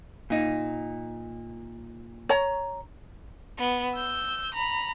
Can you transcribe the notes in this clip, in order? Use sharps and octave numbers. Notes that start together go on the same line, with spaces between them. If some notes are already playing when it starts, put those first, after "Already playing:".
A#2 D#4
C#5 A#5
B3
E6 G6
A#5 B5